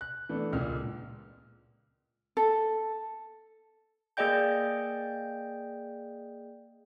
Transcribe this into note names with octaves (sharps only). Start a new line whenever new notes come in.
F#6
E3 A3 B3 D4
C#2 A#2 A#3 F6
A4
A#3 G#4 D5 D#5 G5 G6